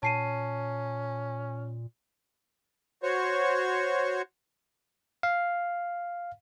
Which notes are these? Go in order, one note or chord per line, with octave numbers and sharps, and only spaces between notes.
A#2 C#4 A5 C7 D#7
F#4 C5 C#5 C#6
F5